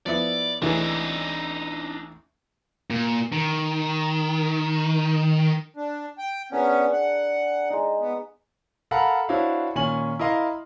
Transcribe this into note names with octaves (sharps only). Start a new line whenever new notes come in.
F3 B3 E4 D5
A1 E3 D4 D#4 G#4
A#2
D#3
D4
G5
B3 C#4 D4 G#4 A#4
F#5
G#3 D#4
B3
A4 A#4 F5 F#5 B5
D4 E4 F#4 C5 C#5 F5
A#2 D#3 C#4 G#5 C#6 F#7
E4 A#4 D#5 F5 C6